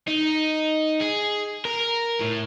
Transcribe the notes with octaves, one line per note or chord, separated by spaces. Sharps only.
D#4
G#4
A#4
A2